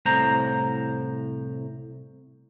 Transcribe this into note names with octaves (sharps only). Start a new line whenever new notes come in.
C2 A2 C5 A#5